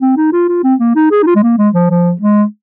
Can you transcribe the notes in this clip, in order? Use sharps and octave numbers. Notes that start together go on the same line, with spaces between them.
C4
D#4
F4
F4
C4
A#3
D#4
G#4
D#4
F4
G#3
A#3
G#3
F3
F3
G#3